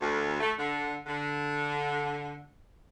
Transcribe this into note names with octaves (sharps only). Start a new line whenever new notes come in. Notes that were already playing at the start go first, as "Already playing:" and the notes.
D2
A3
D3
D3